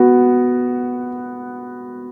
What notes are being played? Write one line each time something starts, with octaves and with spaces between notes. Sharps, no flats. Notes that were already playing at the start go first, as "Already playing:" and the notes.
Already playing: B3 F#4